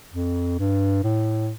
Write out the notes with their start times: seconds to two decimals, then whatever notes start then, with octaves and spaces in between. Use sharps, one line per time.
0.13 F2
0.59 G2
1.04 A2